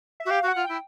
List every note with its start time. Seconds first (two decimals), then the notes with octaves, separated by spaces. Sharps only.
0.20 E5
0.25 F#4
0.30 G4 F5
0.43 F#4
0.48 F#5
0.56 F4
0.65 E4 G5